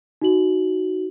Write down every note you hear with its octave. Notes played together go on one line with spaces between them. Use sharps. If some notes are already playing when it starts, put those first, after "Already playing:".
D#4 F#4 F#7